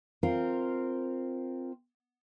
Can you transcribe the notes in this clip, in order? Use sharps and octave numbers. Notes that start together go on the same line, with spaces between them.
C4 F4 A#4